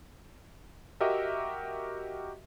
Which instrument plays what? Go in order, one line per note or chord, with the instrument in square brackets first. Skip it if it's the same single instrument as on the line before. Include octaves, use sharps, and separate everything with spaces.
[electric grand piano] F#4 G4 A#4 D#5 E5